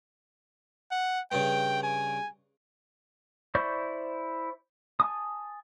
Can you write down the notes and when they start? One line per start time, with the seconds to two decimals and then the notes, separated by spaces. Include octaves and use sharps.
0.91 F#5
1.32 G2 C#3 G5
1.83 G#5
3.55 E4 C5 D5 C#6 G6
5.00 G#5 A5 D#6